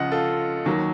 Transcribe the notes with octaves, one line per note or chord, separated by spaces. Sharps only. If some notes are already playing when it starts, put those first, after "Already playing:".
Already playing: C#2 C#3 F3 D#5 F#5
F4 A4
D#2 D#3 F#3